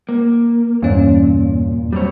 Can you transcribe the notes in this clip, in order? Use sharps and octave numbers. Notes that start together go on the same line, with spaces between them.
A#3
E2 G2 A#2 C#4
F#3 G3 C4 C#5